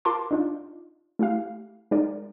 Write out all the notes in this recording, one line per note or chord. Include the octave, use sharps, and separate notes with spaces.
F4 A#4 A5 C6 D6
D4 D#4 F4
A3 E4 G4 F5
G#3 D#4 A#4 D5